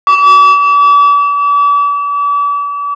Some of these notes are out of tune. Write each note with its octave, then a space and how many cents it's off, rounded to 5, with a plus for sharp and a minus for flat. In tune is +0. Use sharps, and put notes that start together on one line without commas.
D6 -40